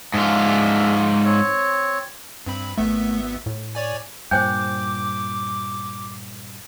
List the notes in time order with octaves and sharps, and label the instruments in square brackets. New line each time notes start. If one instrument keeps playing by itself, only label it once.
[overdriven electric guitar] G#2 F4 [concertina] D4 G#4 E5
[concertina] C4 C#5
[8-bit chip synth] G2 C4 B5
[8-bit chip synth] G#1 B3 E5 [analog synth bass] A3
[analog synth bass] A2
[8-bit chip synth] C#5 D5 G#5
[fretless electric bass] G2 A#2 [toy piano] C5 G5 G#5 [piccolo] D6 [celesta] G6